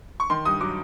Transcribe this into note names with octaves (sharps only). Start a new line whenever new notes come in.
C#6
D#3 C6
G2 D#6
F#3 D6